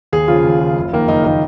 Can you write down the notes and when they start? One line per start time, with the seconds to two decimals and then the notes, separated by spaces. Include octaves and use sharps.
0.13 D#2 G#4
0.28 C#3 F3 F4
0.44 D#2
0.60 C#3 F3
0.77 F#1
0.92 F2 D#3 A#3
1.08 F#1 D#4
1.24 D#3 A#3 D#4